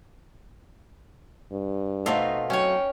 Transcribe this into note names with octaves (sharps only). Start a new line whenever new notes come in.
G2
B2 A3 C4 D#4 F4 F5
F#3 C#4 C#5 G5